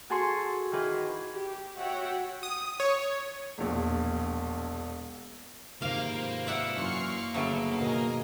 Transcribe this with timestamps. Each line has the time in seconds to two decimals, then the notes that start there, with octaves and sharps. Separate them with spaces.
0.10 F#4 G#4 A4 G#5 C6 C#6
0.72 D#3 E3 G#4 B4
1.33 G4
1.78 F#4 C#5 E5 F#5 G5
2.43 D#6
2.80 C#5
3.58 E1 A#1
5.82 D#2 G#2 C3 A#3 F4 B4 C5 F5
6.47 D5 E5 F#5
6.76 F#2 E3 C6 C#6 F6 C7
7.34 G1 A2 C#3 F#3 B3 A4 E5 D7
7.79 D#2 B2 A#4 D#5 G#5 A#5